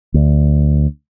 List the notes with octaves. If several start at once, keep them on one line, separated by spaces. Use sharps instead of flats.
D2